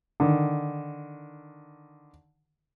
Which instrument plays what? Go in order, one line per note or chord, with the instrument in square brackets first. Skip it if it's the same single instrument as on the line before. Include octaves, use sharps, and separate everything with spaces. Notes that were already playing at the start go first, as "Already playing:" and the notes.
[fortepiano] D3 D#3